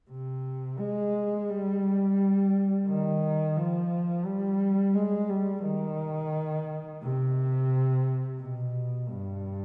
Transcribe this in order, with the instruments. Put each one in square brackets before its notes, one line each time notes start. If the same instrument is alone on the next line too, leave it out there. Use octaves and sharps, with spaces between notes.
[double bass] C3
G#3
G3
D#3
F3
G3
G#3
G3
D#3
C3
B2
G2